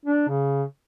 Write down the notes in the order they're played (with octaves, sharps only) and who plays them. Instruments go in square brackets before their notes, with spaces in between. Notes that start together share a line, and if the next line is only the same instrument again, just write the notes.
[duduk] D4
C#3